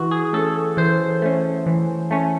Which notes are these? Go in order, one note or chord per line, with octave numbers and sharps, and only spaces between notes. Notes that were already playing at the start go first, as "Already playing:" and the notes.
Already playing: E3 F#4
G#4
A3 C#4 A4
E3 C5
A3 C#4
E3
A3 C#4